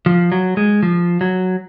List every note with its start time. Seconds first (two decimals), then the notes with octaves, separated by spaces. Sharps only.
0.06 F3
0.32 F#3
0.57 G#3
0.83 F3
1.21 F#3